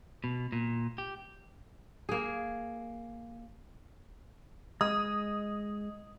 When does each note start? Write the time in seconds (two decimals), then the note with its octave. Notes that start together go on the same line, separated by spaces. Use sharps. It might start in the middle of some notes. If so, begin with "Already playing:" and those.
0.24 B2
0.52 A#2
0.98 G4
2.09 A#3 G#4
4.81 G#3 D#5 D#6